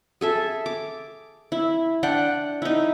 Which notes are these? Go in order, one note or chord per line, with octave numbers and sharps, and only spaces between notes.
G#4 A4 E5
D6
E4
D4 F#5 G5
D#4 E4